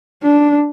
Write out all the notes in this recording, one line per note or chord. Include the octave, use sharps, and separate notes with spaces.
D4